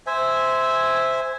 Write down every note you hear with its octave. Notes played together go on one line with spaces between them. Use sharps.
C5 E5 G#5